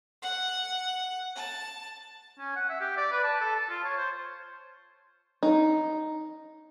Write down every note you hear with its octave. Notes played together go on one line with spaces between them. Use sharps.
F#5
A5
C#4
F#5
E5
G4
D5
B4
A5
A4
A5
F4
C#5
C5
D#4